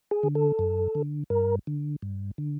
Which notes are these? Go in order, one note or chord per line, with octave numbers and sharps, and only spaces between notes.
G#4
D3
A4
F#2
D3
G2 A#4
D3
G2
D3